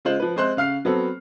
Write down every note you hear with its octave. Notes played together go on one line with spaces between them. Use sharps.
C#3 G#3 F4 C5 F#7
F3 B4
G#3 C4 C5 C6 F#6
C#3 F5 F6 C7
F#3 B3 C4 A4